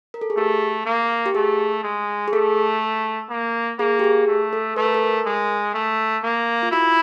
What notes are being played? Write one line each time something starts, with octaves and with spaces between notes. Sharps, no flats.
A#4
A4
G#4
A3 G4
A#3
G4
A3 G#4
G#3
G#4
A3 A4
A#3
A#3 G#4
G4
G#4
A3
A4
A3 B4
A#4
A4
A#4
G#3
A3
A#3
F4
E4 F#4